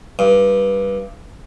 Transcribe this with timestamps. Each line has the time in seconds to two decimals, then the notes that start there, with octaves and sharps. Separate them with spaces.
0.19 G2